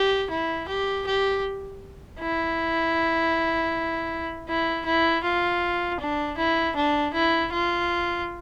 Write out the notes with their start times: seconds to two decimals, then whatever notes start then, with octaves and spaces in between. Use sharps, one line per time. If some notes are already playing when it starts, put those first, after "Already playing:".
Already playing: G4
0.30 E4
0.68 G4
1.07 G4
2.20 E4
4.48 E4
4.85 E4
5.23 F4
6.00 D4
6.37 E4
6.76 D4
7.13 E4
7.52 F4